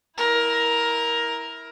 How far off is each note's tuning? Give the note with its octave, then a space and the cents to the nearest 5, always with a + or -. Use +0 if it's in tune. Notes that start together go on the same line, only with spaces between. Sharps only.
E4 -15 A#4 +10